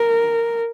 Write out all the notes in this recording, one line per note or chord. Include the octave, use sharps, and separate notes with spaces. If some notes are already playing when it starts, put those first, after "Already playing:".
Already playing: A#4